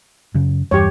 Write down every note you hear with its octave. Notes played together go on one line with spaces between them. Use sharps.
F#2 C#3
E2 G2 G4 C#5